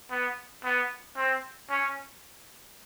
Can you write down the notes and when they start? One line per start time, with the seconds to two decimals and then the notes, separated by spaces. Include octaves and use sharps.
0.11 B3
0.64 B3
1.17 C4
1.70 C#4